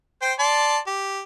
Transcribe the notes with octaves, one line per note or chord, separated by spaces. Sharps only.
C5 G5
D5 A5 C6
G4